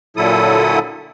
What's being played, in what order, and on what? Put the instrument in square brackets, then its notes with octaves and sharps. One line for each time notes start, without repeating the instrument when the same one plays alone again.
[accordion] A#2 D3 F#3 E4 A4 D#6